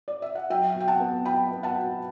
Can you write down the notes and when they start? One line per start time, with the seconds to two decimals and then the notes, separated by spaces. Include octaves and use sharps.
0.08 D5
0.22 E5
0.35 F#5
0.50 F#3 E5 G5
0.75 B2
0.80 G5
0.88 F#5 A5
1.00 B3
1.25 F#3 G5 B5
1.52 B3
1.63 F#5 A5
1.76 B2